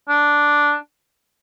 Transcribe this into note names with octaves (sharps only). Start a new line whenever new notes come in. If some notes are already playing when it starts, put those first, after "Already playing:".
D4